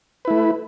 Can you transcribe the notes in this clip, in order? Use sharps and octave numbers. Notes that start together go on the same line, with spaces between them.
A3 E4 B4